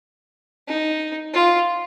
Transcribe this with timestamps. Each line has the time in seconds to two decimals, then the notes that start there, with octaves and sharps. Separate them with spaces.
0.68 D#4
1.34 F4